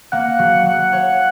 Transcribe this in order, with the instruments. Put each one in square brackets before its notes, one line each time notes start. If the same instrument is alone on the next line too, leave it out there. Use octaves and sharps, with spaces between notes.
[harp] A#3 [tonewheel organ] F#5
[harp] F#3
F#3
C#5